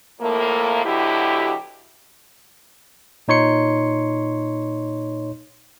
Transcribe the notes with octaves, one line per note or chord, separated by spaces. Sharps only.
F2 A2 A3 A#3
B2 D3 F#3 E4 G4
A#2 D#4 C#5 C6 C#7